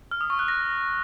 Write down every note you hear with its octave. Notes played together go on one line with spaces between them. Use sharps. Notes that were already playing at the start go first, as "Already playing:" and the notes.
F6
D#6
C#6
F#6
A#6